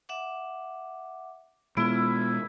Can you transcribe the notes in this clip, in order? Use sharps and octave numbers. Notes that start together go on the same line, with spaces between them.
E5 F#5 D6
B2 G#3 B3 E4 F4